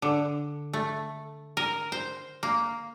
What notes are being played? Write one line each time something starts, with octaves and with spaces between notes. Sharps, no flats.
D3
A3
A#4
C5
A#3